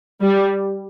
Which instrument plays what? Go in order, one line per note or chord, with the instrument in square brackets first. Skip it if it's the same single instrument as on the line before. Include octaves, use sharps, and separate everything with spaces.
[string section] G3